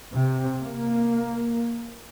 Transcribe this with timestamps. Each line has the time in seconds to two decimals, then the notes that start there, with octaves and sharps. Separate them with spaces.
0.13 C3
0.61 A#3